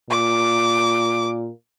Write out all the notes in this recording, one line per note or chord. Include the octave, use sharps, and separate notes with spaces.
A#2 D6